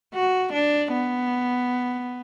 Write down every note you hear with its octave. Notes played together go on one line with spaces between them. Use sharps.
F#4
D4
B3